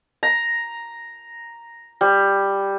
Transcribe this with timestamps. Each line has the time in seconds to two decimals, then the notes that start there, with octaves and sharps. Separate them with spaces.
0.23 A#5
2.01 G3